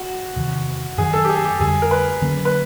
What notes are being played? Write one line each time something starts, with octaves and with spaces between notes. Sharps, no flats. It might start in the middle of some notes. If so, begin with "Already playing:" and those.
Already playing: F#4
E2 C3 D#3
F#2 D#3 F#3 G#4
A4
G4
G#4
G4
F2 D3 G3 G#4
A#4
B4
D3 F#3 A#3 C#4
B4